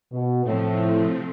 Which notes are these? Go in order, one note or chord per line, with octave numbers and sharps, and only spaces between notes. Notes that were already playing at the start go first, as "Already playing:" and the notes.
B2
A2 C3 F3 A3 C4